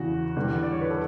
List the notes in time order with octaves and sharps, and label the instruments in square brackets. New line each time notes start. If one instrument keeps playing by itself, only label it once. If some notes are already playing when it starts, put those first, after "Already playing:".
Already playing: [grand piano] E2 C#3 E3 F#4
E2 D3 G3 B3
D5
C#5
B4
A4